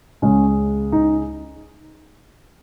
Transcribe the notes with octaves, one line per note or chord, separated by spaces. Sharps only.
C#2 C#3 G#3 C#4
D#4